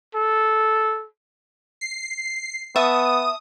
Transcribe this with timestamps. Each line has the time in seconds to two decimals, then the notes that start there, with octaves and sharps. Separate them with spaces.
0.15 A4
1.81 C7
2.76 B3 E5 A5 C#6 D#6